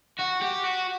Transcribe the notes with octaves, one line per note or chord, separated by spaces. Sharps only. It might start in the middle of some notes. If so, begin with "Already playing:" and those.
F#4
G4
F#4